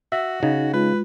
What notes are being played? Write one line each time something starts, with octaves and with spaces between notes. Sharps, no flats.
F#4 E5
C#3 D#4
G#3 F4 B4